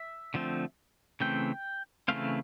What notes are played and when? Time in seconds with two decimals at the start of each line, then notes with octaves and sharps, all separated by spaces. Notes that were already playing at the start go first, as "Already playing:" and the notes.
Already playing: E5
0.34 D3 F3 A3 C4
1.20 C#3 E3 A3 C4 G5
2.08 C#3 E3 A3 C4 F5